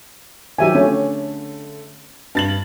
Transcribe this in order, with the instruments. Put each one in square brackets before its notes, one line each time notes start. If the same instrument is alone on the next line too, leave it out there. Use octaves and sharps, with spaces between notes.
[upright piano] D#3 F3 F#3 [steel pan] G4 E5 G#5
[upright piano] D3 A3 [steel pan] C#4
[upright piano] G2 A6 F#7